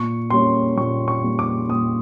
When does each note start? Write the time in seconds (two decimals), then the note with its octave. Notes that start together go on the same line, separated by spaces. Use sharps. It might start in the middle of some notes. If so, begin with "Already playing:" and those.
Already playing: A#2 C#6
0.30 G3 A#3 C#4 C6
0.77 A#2 C#6
1.08 C#6
1.23 G3 A#3 C#4
1.39 D6
1.69 A#2 D#6